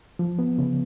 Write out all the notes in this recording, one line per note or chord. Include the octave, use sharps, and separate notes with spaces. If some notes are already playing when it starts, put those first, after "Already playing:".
F3
B3
C#3